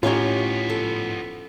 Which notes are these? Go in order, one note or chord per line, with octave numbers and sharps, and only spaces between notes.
A2 F3 B3 C#4 D#4 F4 G4 C#5
A4